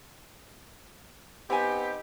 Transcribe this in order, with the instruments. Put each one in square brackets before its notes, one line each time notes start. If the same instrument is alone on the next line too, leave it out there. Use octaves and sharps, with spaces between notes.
[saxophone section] B3 D#4 G4 [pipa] C4 G#5